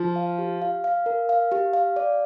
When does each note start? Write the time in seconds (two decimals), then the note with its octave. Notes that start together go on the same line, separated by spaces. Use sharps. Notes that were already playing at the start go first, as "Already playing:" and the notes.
Already playing: F3
0.16 F5
0.39 G4
0.62 F5
0.84 F5
1.06 A#4
1.29 F5
1.52 G4
1.73 F5
1.96 D5